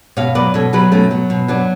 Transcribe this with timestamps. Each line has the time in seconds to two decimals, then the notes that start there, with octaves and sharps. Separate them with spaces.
0.17 B2 C#5 F5
0.35 F#3 B4 D5
0.54 B2 A4 C#5
0.73 F#3 G#4 B4
0.92 B2 A3 C#4
1.11 F#3
1.30 B2
1.48 F#3 B3 D4